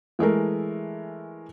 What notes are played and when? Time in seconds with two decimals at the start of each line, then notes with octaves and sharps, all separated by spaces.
0.19 E3 G#3 A3 A#4